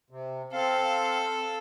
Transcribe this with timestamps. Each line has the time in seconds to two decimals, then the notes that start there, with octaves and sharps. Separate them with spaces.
0.10 C3
0.53 C4 A4 F5